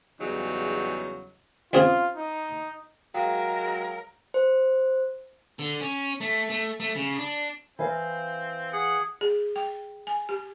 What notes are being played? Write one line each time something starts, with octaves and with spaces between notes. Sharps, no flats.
E2 C#3 F#3 G3 D#4
C#2 C4 F4 G#4
D#4
F#3 G#3 A#4 F5 G5
C5
D3
C#4
A3
A3
A3
C#3
D4
E3 C4 F5
G#4 F#5
G#4
G5
G#5
G4